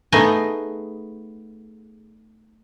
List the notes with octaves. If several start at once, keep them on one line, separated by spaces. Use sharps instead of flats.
A3 B3 D#4 G#4 D#5 G#5